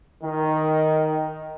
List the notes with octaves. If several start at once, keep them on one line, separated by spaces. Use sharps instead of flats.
D#3